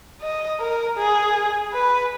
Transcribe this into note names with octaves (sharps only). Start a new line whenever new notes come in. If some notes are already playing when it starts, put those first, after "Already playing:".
D#5
A#4
G#4
B4